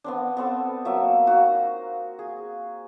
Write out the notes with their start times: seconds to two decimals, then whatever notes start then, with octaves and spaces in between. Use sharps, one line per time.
0.04 B3 C4 D4
0.37 B3 C4 A4
0.85 F#3 A#3 E5
1.27 D#4 F#4 F5
2.19 G#4